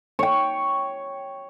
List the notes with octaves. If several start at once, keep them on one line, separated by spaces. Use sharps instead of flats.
C#5 G5